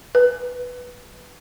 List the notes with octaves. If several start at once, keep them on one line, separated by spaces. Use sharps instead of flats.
B4